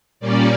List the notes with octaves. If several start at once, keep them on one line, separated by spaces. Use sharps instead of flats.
A#2 G3 A#3 C#4 D5